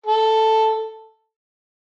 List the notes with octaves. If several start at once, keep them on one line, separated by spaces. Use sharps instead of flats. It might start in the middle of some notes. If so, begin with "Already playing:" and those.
A4